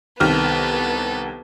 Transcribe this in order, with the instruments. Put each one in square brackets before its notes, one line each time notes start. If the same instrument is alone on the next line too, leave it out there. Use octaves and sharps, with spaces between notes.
[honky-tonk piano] C2 D#3 F6 [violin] B3 A4